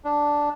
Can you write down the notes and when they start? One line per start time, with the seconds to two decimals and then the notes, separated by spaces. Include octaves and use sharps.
0.04 D4